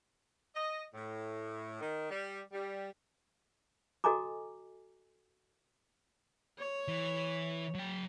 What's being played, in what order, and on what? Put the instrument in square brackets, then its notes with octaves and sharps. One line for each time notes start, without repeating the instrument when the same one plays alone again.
[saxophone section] D#5
A2
D#3
G3
G3
[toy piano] F#4 A4 D#5 G#5 A#5 D6
[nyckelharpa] C#5
[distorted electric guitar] E3
F#3 G5